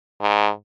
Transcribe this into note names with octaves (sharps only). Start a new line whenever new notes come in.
G#2